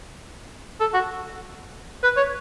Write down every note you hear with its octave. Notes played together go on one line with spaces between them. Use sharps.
A4
F#4
B4
C#5